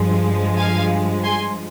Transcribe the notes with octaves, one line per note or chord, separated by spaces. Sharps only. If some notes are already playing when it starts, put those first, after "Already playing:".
Already playing: G2 F3 G#3
F5 G#5
G#5 C6